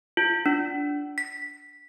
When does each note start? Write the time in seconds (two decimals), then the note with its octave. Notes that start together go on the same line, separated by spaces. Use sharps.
0.17 F4
0.46 D4
1.18 B6